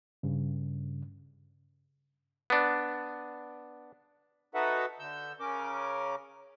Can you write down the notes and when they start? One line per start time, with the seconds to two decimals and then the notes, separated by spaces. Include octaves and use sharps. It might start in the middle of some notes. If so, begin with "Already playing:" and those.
0.23 G2 C#3
2.50 B3 D4
4.55 D#4 F#4 A4 B4 E5 F#5
4.99 D3 E6 G6
5.40 C#3 C#4 A#4 D6